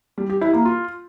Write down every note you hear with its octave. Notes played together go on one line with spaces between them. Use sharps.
G3
G4
E4
A#3
F4